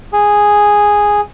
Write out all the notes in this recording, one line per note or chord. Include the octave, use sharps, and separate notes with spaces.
G#4